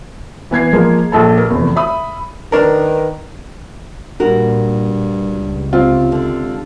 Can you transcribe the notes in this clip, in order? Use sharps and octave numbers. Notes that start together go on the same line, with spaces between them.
E3 B3 G#6 C7
F3 G#3 A#3
A#1 A4 A5
A#3 A#4
F1 E2
E5 B5 D#6
D#3 D4 A#4 B4
G2 A#2 F#4 A#4
C#2
C3 C4 F4
D3